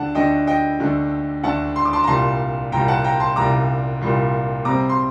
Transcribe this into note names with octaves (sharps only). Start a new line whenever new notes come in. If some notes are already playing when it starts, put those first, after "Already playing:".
Already playing: D2 D3 A3 D4 F#5 A5
D2 D3 A3 D4 D#5 G5
D#5 G5
D2 D3 A3 D4
D2 D3 A3 D4 F#5 A5
C6
D6
A5 C6
A#5
C2 A#2 G3 A5 C6
C2 A#2 G3 G5 A#5
F#5 A5
G5 A#5
A5 C6
C2 A#2 G3 A#5 D6
C2 A#2 G3
C3 G3 C4 A#5 D6
C6